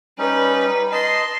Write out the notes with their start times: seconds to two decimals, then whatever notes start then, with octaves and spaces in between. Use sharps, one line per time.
0.19 G3 C#4 D#4 B4
0.92 D#5 A5 C6